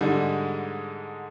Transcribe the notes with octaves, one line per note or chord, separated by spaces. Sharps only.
G#2 D3 G3 G#3